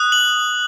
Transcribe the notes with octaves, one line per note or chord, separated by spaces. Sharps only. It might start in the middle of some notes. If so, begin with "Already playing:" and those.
Already playing: D#6 F#6
F#7